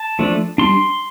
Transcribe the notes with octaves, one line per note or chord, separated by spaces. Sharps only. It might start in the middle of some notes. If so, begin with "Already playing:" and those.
Already playing: A5
F3 A3 D4
G3 D4 C6